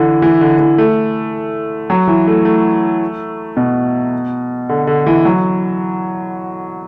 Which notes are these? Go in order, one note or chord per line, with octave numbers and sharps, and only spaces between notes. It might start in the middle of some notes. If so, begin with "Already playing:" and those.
Already playing: D3 E3
E3
D3
E3
A3
F#3
E3
A3
A3
B2
D3
D3
E3
F#3